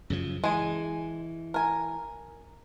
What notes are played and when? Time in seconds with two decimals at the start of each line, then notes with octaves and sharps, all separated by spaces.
0.10 F#2 C#3 F3
0.44 E3 G#3 G#4
1.54 A#4 G#5